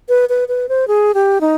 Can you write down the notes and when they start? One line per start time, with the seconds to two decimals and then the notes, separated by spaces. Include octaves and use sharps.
0.09 B4
0.29 B4
0.48 B4
0.69 C5
0.88 G#4
1.14 G4
1.41 D#4